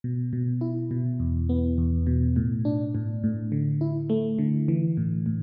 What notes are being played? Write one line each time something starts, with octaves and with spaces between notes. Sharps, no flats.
B2
B2
E4
B2
E2
B3
E2
B2
A2
D4
A2
A2
D3
E4
A3
D3
E3
A2
A2